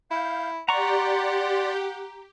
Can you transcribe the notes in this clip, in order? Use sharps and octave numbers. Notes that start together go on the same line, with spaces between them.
E4 F5 G6
G4 D5 F#5 A#5 C6 C#6